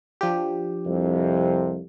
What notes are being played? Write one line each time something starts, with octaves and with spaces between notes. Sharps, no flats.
F3 D4 G4
C2 F2 C3